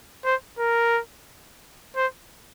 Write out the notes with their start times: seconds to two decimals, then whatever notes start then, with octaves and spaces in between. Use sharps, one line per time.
0.25 C5
0.58 A#4
1.96 C5